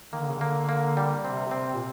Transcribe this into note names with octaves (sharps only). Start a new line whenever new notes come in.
D#3 A#3
D3
C#3
D3
A#3
A#3
G3
C3 C4
C4
A#2